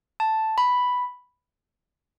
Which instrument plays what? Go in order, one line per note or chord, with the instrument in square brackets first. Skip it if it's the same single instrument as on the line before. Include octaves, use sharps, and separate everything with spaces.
[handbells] A5
B5